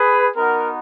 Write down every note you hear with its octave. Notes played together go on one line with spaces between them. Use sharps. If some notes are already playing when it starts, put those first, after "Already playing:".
Already playing: G#4 B4
B3 D#4 F#4 A#4